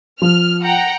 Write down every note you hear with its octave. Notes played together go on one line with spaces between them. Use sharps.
F3 F6
F#5 G5 A#5